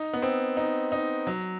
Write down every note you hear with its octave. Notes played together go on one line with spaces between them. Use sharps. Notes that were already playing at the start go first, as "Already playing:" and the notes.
Already playing: D#4
B3
C4
D#4
D#4
F#3